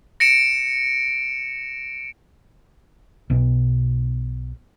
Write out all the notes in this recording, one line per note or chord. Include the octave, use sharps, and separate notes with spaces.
A#6 C#7 D7 E7
B1 B2